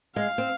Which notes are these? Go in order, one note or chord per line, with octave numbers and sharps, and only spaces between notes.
G#3 F5
C4